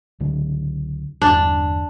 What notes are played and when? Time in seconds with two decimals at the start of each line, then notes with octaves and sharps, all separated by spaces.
0.20 C#2 D3 F#3
1.22 G1 E2 D4